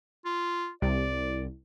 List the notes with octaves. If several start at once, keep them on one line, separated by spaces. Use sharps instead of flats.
F4
C2 D5